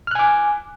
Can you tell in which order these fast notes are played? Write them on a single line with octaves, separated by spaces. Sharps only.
F6 F#6 G#5 D6